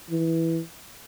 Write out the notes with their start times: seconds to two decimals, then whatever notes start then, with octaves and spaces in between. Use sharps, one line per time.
0.10 E3